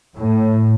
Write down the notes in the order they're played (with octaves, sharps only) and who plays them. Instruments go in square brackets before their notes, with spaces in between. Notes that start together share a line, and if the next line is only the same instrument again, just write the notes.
[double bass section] A2